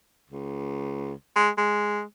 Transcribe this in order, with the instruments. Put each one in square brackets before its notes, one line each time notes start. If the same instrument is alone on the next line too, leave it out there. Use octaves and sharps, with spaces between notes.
[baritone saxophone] C#2
G#3
G#3